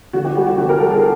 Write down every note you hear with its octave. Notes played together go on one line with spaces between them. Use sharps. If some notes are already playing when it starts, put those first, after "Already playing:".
D3 F#4
G4
G3 F#4
F#4
D3 G4
A#4
G3 A4
G#4